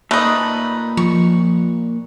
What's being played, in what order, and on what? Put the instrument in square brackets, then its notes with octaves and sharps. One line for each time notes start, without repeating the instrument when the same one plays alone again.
[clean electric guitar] A#2 D5 [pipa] A3 D#4 [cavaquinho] B4
[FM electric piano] F3 [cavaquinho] C#6